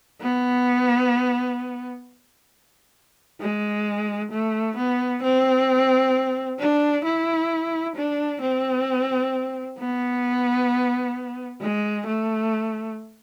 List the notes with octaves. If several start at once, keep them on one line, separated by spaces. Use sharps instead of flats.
B3
G#3
A3
B3
C4
D4
E4
D4
C4
B3
G#3
A3